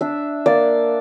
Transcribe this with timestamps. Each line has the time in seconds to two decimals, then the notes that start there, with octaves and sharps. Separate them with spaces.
0.01 D4 E5
0.46 A#3 D5